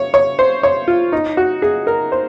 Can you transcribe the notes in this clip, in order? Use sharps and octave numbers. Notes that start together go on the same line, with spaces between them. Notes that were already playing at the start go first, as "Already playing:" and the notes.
Already playing: C#5
C#5
C5
C#5
F4
D#4
F#4
G#4
A#4
C5